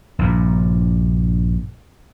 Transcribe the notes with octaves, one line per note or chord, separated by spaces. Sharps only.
A#1 G2 A#2